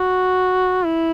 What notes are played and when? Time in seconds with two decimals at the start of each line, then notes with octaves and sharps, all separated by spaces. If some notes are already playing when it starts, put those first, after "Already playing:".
Already playing: F#4
0.85 E4